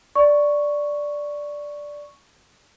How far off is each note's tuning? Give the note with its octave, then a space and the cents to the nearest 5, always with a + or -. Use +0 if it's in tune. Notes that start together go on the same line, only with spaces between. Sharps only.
D5 +0 C#6 +0